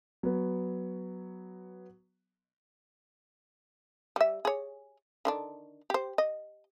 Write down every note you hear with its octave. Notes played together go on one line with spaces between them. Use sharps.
F#3 B3
G3 E5
G#4 C#5
D3 D#3 D4
G4 C5
D#5